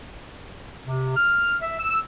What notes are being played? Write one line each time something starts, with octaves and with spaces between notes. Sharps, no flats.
C3
F6
E5
E6